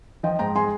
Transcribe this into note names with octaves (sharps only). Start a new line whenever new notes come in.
F3 D#5 G5
G#2 G5 A#5
G#3 G#5 C6